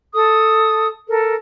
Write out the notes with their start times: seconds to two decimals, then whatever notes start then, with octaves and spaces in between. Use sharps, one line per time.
0.13 A4 D#6
1.09 A4 A#4